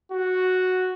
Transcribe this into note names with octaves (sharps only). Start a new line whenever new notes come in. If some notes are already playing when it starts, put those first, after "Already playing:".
F#4